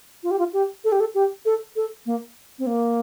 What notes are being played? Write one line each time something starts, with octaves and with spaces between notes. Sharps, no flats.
F4
G4
F4
G4
A4
G4
A4
G4
A4
A4
A#3
C4
A#3